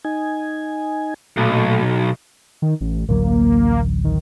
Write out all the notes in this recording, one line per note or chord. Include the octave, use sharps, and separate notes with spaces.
D#4 G#5
B1 A#2 A3
D#3
A1
A1 D2 F#3 A#3
D#3